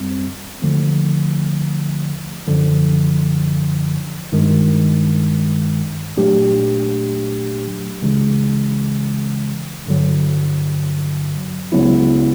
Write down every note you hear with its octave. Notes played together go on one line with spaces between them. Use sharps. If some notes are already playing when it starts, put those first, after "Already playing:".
Already playing: G#1 F#2 G3 C4
D#2 D3 F3 A3
G#1 F#2 D3 F3
G#1 G2 D#3 G#3
A#2 F#3 A3 D4 G4
C#2 C#3 E3 G#3
G2 D3 F#3
C#2 C#3 F#3 B3 E4